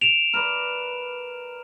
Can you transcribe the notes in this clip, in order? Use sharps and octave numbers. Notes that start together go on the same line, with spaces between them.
D7 E7 F7
A#4 B4 D5